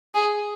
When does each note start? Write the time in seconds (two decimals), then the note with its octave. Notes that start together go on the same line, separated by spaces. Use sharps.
0.15 G#4